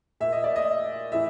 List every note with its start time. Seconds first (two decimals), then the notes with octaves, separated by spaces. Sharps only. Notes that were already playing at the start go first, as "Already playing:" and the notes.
0.20 A#2 E5
0.32 D#5
0.44 D5
0.56 D#5
1.12 A2 E3 E5